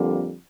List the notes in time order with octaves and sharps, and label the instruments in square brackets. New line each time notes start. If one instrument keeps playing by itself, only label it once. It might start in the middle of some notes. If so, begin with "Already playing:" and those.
Already playing: [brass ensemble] F2 D3 G3 A#3